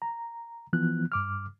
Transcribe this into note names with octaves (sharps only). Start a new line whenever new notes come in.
A#5
E3 F3 B3 F#6
G2 D6 F6